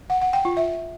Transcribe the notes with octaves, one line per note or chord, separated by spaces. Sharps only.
F#5
F#5
G5
F4
E5